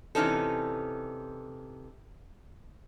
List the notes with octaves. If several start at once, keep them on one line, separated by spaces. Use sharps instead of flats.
C3 E3 A#3 C#4 D#4 A4